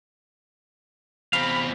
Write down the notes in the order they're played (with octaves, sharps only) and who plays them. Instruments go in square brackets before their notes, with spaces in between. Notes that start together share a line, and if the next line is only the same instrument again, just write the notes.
[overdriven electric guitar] E2 C4 [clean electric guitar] C3 F5 [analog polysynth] B5